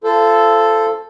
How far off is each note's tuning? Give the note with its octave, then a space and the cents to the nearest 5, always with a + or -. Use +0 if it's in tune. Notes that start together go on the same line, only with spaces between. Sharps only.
F4 -30 A4 +0 C5 +0